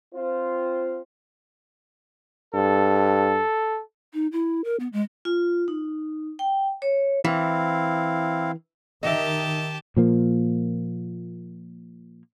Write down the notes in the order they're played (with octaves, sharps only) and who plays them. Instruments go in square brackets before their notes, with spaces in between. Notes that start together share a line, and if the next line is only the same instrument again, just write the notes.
[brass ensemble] C4 F4 C5
[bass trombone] G2 [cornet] A4
[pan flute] D#4
E4
A#4
B3
G#3
[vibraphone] F4
D#4
G5
C#5
[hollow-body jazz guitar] E3 [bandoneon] C4 E4 F5
[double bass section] D#3 [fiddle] G4 A5 [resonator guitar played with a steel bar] D#5 E5
[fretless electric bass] A#2 F3 A#3